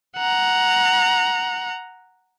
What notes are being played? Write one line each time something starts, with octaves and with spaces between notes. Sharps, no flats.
F#5 A#5